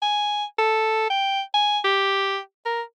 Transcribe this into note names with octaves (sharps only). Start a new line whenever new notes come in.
G#5
A4
G5
G#5
G4
A#4